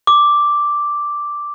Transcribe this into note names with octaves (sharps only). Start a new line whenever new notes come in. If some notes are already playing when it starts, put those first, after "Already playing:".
D6